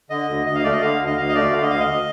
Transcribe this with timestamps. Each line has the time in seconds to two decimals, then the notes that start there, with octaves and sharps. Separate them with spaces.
0.10 D3 D#5
0.28 D2
0.46 D2 D#5
0.55 F5
0.64 A3 D5
0.72 D#5
0.82 D3 F5
1.00 D2
1.07 D#5
1.17 D2 F5
1.29 D#5
1.35 A3 D5
1.53 D3 F5
1.62 D#5
1.71 D2 F5
1.79 D#5